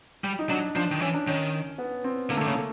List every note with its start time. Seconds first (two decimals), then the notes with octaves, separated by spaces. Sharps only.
0.24 G3
0.39 D#4
0.49 F#3 D4
0.76 F3 D4
0.91 D#3
1.02 E3 C#4
1.14 D4
1.27 D#3 C#4
1.78 B3
2.04 C4
2.29 D3 A#3
2.37 A3
2.41 D3
2.45 C#3 A#3
2.55 A3